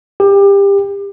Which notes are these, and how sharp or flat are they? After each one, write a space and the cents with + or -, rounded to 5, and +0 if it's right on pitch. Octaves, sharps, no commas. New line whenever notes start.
G4 +25